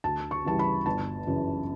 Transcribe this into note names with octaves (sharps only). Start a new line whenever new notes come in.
D2 A5
C#6
C#3 E3 G3 A5
B5
G1 A5
F#2 C#3 E3